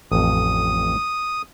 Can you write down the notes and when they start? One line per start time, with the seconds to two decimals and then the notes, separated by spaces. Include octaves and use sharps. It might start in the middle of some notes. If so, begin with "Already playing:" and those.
0.11 A1 F2 D#6